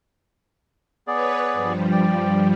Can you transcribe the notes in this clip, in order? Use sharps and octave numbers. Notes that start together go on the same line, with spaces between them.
B3 G#4 B4 C#5 D5
G2 F3 G3
D5 G5